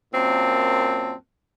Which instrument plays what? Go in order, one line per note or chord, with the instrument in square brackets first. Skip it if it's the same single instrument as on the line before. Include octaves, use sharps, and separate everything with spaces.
[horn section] F#2 A#2 C4 A5